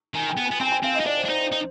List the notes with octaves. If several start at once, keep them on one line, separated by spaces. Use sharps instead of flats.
D#3 G#5
G5
B3
G#5
B3
C4 G5
G#5
G5
C4 F5
D#5
D#4
D4 D5
C5
D4
D#4 C5
C5
D#4